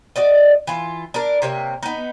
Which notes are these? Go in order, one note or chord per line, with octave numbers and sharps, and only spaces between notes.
F#4 D5 D#5
E3 F4
D4 A#4
C3 A#3 C#5
B3 D#4